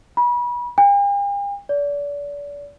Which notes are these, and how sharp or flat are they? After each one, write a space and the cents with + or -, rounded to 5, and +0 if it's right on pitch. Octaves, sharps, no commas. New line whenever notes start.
B5 -30
G5 +45
D5 -35